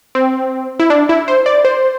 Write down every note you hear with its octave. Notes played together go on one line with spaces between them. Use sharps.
C4
E4
D4
E4
C5
D5
C5